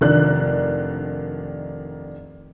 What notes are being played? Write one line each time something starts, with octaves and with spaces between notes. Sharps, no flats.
F1 D#3 D4 F#6